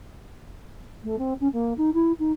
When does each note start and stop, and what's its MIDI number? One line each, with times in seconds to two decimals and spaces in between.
1.03 1.16 57
1.18 1.33 60
1.40 1.48 61
1.53 1.73 58
1.77 1.90 63
1.94 2.12 64
2.19 2.32 63